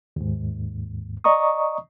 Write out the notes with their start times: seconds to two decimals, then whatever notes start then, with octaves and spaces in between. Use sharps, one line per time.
0.16 D#2 G#2
1.24 D5 D#5 A#5 C#6 D#6